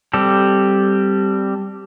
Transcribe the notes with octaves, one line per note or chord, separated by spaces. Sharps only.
G3 C4 G4 A4